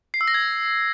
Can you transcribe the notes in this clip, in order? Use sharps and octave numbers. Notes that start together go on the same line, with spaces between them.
C7
E6
A#6
G#6